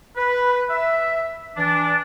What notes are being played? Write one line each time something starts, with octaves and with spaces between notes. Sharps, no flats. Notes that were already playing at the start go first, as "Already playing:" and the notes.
B4
E5
E3 D4